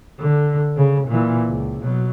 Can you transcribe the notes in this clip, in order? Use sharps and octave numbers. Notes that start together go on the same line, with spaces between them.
D3
C#3
A#2 E3
C#2
B2 F#3